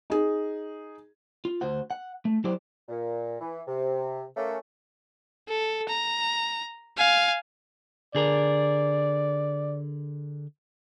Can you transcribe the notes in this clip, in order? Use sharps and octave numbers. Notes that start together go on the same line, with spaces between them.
D#4 G#4
F4
D2 F#4 C5 F#5
F#5
A3
F#3 E4 G4 C5 D5
A#2
E3
C3
A3 A#3 C#4
A4
A#5
F5 G#5
D3 G#4 A#4 D5